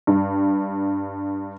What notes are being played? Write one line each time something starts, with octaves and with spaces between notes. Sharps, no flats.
G2